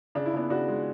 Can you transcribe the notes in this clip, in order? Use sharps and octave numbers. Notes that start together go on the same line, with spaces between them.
C#3 D4
E4
C#3 B3 D4
C#3 D4 F#4
G#3